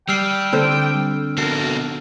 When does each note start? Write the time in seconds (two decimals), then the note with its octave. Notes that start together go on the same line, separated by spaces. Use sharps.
0.09 G3 G5 E6 F6 C7
0.53 D3 C4 C5
1.38 B3 F#4 A4 A#4 C7